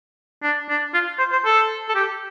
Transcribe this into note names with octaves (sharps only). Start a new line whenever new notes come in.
D4
D4
F4
C5
C5
A4
A4
G4